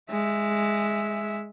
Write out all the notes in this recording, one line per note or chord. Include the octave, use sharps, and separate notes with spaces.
G#3 E5